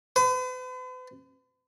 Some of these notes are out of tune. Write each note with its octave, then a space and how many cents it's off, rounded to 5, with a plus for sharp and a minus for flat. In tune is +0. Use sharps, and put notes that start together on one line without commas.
B4 +45